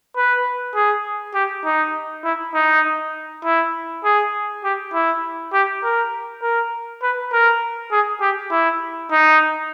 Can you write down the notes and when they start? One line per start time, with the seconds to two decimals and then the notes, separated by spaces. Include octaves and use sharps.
0.16 B4
0.75 G#4
1.35 G4
1.65 D#4
2.25 E4
2.54 D#4
3.45 E4
4.04 G#4
4.64 G4
4.94 E4
5.53 G4
5.83 A#4
6.43 A#4
7.02 B4
7.33 A#4
7.92 G#4
8.21 G4
8.51 E4
9.12 D#4